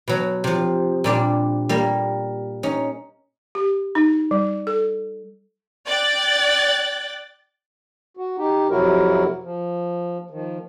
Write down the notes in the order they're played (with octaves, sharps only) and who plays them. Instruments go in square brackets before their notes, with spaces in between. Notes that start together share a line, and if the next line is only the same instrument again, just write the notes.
[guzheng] B2 F#3
C3 F3
A#2 G3 D4
G3 A#3
C#4 D#4
[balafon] G4
D#4
G3
A4
[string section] D5 G5 F#6 A6
[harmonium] F#4
D#4 G4
F2 C3 F#3 E4 F#4 A#4
F3
D#3 F3